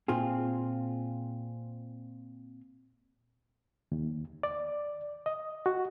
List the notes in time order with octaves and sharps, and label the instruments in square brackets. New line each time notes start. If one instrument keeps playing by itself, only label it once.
[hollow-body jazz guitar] A#2 C4 F4 G#4
[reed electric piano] D#2
D5
D#5
F#4